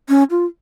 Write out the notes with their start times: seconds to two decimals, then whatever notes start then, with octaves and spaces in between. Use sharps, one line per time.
0.09 C#4
0.31 F4